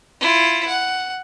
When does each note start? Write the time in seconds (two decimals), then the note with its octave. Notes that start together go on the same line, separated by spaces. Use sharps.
0.21 E4 F4
0.67 F#5